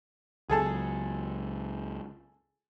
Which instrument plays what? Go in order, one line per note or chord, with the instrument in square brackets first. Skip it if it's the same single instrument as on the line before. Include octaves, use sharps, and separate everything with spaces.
[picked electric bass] C#2 F#3 [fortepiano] G#4 A4 A5